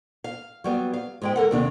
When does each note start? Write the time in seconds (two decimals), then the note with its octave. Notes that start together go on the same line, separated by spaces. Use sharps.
0.24 F5
0.64 F#3 G3 B3
0.94 F5
1.22 G#2 G#3 G5
1.36 A4 A#4 F#5
1.51 D#2 C3 D4